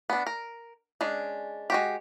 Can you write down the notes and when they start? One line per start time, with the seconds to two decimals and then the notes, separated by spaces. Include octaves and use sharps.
0.10 B3 D4
0.27 A#4
1.01 G#3 C#4 D4
1.70 G#3 F#4 G4